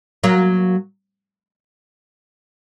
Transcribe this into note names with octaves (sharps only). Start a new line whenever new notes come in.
F#3 A#3